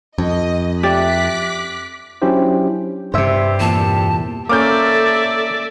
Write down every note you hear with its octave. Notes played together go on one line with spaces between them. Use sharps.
F2 D#5
G4 D5 E5 D6 F#6 B6
F#3 C#4 D4 E4 G4 C5
G2 C3 G4 C5 E5
E2 A#2 A5
A#3 C#4 A4 D5 E5 D6 F6 G6